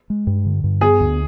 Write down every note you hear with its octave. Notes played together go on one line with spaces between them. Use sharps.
G#3
G2
D3
G2
B3 G#4
D2